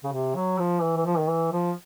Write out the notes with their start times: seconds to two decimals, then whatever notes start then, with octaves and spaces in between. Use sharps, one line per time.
0.04 C#3
0.12 C3
0.36 F#3
0.59 F3
0.82 E3
0.96 E3
1.05 F3
1.18 D#3
1.28 E3
1.52 F3